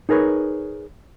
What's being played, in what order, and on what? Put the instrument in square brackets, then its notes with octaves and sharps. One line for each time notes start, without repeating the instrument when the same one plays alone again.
[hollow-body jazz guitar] D#4 G#4 A#4 B4 C#5